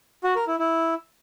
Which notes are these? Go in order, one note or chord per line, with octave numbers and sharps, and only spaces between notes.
F#4
A#4
E4
E4